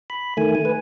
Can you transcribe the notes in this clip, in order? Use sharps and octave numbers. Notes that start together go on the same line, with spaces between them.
B5
D#3 A3 G#5
G#5
B4